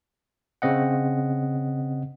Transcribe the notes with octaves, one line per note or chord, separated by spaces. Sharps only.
C#3 C4 D#5 F#5